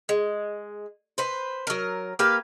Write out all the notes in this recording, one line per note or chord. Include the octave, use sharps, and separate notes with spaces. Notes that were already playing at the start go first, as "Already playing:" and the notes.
G#3
B4 C5
F#3 A#4
A#3 G4 B4 F5